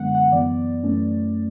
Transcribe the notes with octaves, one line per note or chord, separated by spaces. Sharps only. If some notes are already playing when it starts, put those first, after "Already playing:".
Already playing: F#2 D3 G#3 B3 F#5
F#5
F#2 E3 B3 D5
F#2 E3 A3 C#4